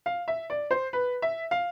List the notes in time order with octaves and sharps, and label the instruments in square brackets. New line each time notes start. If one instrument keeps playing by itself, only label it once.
[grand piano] F5
E5
D5
C5
B4
E5
F5